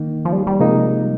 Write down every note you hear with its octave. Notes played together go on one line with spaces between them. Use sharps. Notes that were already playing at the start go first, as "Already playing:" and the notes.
Already playing: D#3 A#3 D#4
F3
G3
G3
C3 F3 G#3 A#3 D#4
G3